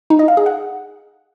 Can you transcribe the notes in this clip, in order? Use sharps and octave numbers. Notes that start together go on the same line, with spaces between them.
D#4
D#5
F5
G#4
F#5